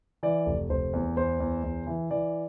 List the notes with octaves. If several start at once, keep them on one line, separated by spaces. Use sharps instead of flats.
E3 D5
F1
F1 C5
E2
E2 C5
E2
E2
E3
E3 D5